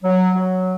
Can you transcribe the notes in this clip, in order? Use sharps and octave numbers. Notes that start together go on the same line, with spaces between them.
F#3
F#3